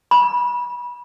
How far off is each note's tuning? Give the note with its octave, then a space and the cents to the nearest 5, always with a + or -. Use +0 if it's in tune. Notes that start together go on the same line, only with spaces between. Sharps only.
B5 -25